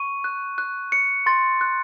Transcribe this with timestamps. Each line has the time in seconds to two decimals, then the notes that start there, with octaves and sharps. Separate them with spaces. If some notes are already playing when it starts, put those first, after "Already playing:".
Already playing: C#6 D#7
0.24 F#6
0.58 F#6
0.92 F#6 C#7
1.26 C6 A6
1.61 F#6